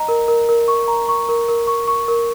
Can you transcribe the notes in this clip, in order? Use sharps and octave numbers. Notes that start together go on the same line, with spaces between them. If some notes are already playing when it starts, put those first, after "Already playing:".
Already playing: D#5 A#5
A#4
A#4
A#4
C#6
A#5
C#6
A#4
A#4
C#6
C#6
A#4